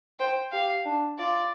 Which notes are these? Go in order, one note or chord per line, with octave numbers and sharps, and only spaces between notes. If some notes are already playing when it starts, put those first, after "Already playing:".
C5 G5
G4 F5
D4
F4 D5